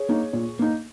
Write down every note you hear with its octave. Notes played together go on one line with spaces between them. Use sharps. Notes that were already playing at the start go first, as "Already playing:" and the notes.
Already playing: G#4 C#5
A#3 D#4
A#2
A#3 D#4